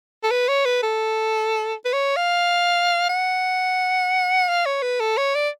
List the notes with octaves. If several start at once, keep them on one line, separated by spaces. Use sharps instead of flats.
A4
B4
C#5
B4
A4
B4
C#5
F5
F#5
F5
C#5
B4
A4
C#5
D5